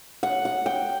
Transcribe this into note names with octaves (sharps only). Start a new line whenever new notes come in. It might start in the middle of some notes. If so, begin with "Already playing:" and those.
F#5
F#5
G5